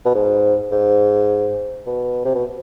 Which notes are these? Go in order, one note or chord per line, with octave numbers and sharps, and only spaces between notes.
B2
G#2
G#2
B2
C3
B2